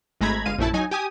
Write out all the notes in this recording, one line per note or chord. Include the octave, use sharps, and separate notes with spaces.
G#1 G#3 A3 A#5 B5 G#6
G1 G#3 F5 D#7
A#1 F#2 A3 E4 A5
F#3 D#4 G#5
G4 G#5 D#6